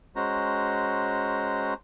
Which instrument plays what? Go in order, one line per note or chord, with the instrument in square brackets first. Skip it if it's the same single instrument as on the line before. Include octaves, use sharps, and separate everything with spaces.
[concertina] G#3 C#4 F#4 C5 A#5